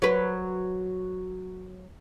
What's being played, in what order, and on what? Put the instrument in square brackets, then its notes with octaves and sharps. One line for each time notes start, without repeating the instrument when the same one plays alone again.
[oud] F#3 B4